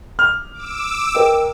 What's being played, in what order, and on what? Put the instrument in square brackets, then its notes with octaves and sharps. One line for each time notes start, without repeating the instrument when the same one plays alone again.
[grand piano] F6
[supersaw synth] D6 E6
[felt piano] A#4 D#5 G5